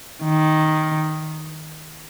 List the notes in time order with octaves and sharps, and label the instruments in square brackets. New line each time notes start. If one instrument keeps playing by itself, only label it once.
[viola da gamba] D#3